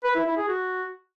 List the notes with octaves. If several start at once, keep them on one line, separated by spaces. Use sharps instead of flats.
B4
E4
E4
G#4
F#4